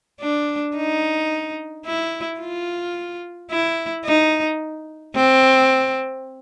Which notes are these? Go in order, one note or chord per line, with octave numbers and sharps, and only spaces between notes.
D4
D#4
E4
F4
E4
D#4
C4